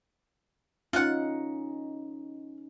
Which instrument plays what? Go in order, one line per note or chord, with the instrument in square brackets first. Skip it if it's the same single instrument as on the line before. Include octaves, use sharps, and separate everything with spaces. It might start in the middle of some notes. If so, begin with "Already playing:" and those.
[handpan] C#4 D#4 [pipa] F4 F#5